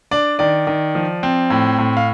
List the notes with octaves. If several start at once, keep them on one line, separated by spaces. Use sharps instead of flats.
D4 D5
D#3 D5
D#3
F3
C4
A2
A2
F5